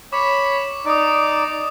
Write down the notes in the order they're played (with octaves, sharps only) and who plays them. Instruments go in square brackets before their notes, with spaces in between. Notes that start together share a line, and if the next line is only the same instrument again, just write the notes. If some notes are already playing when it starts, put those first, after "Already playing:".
[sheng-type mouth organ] C#5 B5 [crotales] D6
[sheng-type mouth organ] D#4 D5 [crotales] D6 D#6